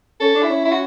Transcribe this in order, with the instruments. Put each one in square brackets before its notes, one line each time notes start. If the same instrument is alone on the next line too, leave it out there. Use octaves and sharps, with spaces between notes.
[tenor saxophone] C#4 [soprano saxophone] A4
[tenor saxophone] D4
[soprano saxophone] E4
[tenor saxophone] C#4
[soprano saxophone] E4
F#4